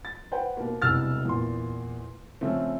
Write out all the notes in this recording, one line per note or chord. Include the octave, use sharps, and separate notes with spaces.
A6
B4 C5 F#5 G5
B2 A#3
E1 C2 E6 F6 A6
E2 A#2 C6
C#3 F3 A3 C4